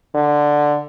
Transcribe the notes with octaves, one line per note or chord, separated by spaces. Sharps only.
D3